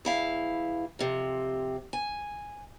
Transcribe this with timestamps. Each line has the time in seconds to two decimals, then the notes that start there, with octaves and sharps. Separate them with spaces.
0.05 E2 E4 F5
0.99 F2 C3
1.93 G#5